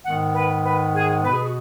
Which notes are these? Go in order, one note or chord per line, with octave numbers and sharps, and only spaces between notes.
G#2 D#3 G#3 B3 F#5
B4
B4
G#4
B2 B3 B4
G#4
F#4